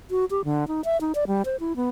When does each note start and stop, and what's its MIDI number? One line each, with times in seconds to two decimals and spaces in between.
0.11 0.25 66
0.31 0.44 67
0.45 0.67 50
0.68 0.81 63
0.85 1.00 76
1.01 1.13 63
1.15 1.25 74
1.27 1.42 55
1.45 1.56 72
1.60 1.76 64
1.76 1.89 59